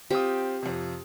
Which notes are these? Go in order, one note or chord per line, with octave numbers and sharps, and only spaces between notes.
C4 F4 G4 D#6
F2 C3